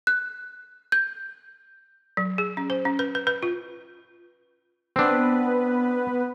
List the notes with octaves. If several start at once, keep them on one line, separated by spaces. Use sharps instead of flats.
F#6
G6
F#3
G#4
C#4
C5
C#4
B4
B4
B4
F4
B3 C4 D4 B4